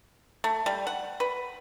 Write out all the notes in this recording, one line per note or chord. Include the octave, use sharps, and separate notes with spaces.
A3
G3
F#5
B4